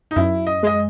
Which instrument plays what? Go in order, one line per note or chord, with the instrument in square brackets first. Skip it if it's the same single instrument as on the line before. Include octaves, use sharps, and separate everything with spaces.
[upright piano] D#4
[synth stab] F#2 [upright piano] E4
[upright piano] D#5
[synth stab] G#3 [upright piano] D#5